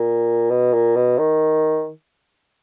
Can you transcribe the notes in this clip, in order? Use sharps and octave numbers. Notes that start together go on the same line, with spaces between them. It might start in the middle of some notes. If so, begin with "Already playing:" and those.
Already playing: A#2
B2
A#2
B2
D#3